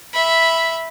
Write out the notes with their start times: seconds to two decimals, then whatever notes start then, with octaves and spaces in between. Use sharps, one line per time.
0.13 E5 B5